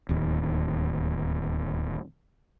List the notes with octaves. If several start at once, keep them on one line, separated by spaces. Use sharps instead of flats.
D1 D#2